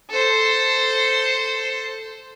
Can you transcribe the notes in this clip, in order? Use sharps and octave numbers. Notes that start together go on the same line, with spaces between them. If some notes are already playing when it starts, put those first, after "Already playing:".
A4 C5